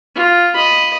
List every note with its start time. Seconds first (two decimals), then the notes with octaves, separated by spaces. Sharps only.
0.15 F4
0.54 D#5 B5